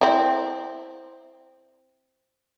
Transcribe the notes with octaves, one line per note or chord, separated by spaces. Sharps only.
C4 E4